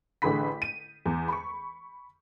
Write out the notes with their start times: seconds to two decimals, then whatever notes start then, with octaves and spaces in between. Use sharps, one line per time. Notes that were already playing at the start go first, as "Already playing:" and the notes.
0.22 A1 D3 G#4 B4 B5 B6
0.62 D#7
1.06 E2
1.28 B5 C#6